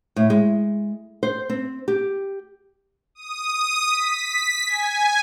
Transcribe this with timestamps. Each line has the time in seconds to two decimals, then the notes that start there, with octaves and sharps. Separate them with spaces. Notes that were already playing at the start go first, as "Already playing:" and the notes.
0.16 A2
0.30 G#3
1.23 C5
1.50 C4
1.88 G4
3.15 D#6
3.89 B6
4.67 G#5